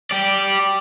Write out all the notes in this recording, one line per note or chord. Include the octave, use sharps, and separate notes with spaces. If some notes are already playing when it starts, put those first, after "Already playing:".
G4 D5